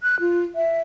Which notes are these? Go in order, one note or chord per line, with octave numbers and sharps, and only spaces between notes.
F#6
F4
E5